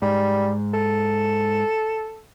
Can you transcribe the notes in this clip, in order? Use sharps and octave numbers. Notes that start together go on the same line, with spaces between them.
G#2 G3
A4